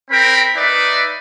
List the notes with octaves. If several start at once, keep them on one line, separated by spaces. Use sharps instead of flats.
C4 A#4 G5 B5
D#4 B4 D5 E5